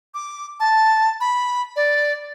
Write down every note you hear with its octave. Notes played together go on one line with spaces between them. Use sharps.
D6
A5
B5
D5